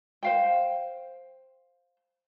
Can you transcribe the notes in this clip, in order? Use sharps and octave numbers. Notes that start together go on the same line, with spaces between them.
C5 F5 G5